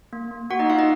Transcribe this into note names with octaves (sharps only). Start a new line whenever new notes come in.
A#3
A#3
A#3 F#4 F#5
D#4 D#5
A#3 F4 F5
D#4 D#5